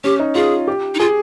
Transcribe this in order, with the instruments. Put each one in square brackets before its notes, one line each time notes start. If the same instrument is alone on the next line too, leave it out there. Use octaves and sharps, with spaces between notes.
[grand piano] C#4 [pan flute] G4
[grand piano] D#4
[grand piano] F4 [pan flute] G#4
[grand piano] G4
[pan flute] D#4
[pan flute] F4 [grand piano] G#4